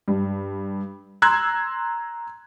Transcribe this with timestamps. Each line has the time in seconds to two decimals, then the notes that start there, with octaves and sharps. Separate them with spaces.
0.08 G2
1.22 A#5 C6 E6 F#6 G#6